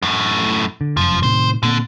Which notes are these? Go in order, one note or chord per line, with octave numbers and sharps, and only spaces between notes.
F#2 A2
D3
F1 F#2 F3
A2 C3 D#3 C5
A#2 D3 A#3 C4